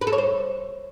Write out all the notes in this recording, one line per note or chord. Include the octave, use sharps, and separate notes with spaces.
B4
A4
C#5
C5